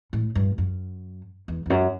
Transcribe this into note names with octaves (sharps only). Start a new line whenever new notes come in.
A2
G2
F#2
E2
E2
F#2